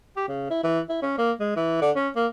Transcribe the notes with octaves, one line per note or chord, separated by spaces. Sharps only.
G4
C#3
E4
E3
E4
C#4
A#3
G#3
E3
D3
C#4
A#3